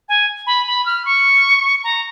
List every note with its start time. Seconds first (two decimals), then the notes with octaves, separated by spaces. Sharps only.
0.09 G#5
0.47 B5
0.67 B5
0.86 F6
1.05 C#6
1.84 A#5